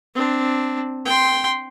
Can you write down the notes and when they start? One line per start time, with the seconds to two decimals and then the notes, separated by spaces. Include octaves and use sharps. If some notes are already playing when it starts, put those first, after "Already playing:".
0.15 C4 D4
1.05 G5 C6